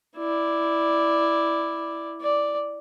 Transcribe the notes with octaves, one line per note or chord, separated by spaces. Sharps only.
E4 D5
D5